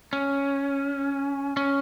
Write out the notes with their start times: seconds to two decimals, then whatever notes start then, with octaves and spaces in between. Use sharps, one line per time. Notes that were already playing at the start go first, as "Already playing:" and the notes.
0.13 C#4
1.57 C#4